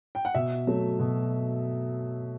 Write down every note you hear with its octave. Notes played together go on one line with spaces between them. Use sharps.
G5
F#5
B2 E5
F#3 A3
B2